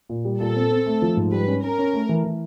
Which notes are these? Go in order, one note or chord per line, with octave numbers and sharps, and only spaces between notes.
A#2
G3
A#2 A4
C4
C4
A3
F3
G#2
G3 B4
C#4
C#4 A#4
C#4
A3
E3
E3